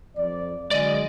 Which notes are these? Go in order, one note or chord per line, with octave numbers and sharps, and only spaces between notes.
F2 D5
D3 F#3 G#3 D5 D#5